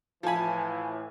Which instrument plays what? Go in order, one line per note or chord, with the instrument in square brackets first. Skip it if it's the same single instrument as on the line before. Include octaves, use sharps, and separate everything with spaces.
[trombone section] A2 E3 [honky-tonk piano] F3 G#5 [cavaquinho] A4 B5